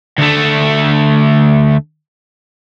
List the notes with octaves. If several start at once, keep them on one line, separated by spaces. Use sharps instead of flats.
D2 A3